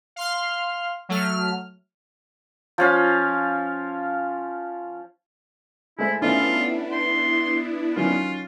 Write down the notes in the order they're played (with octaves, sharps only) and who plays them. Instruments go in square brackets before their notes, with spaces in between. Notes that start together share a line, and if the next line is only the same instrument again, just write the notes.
[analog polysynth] F5 C6 F6
F#3 A3 F6
[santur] F3 C#4 F5
[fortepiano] G#3 A3 C5 [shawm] E4
[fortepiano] D#3 A3 C#4 [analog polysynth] B3 D4 E4 [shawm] F4
[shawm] C6
[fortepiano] D#3 F#3 C#4 [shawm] F4